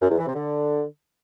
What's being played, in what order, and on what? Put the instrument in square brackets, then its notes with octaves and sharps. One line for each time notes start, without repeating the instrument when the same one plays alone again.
[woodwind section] F#2
E2
E3
C3
D3